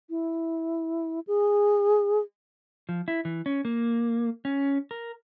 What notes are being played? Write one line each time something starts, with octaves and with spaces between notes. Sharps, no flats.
E4
G#4
F3
E4
E3
C#4
A#3
C#4
A#4